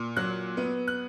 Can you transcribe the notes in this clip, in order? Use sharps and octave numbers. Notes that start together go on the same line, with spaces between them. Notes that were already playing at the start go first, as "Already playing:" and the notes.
Already playing: A#2
F#3 F#6
B3
F#6